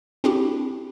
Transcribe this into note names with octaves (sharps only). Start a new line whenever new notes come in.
C4 D4 E4 F#4 G4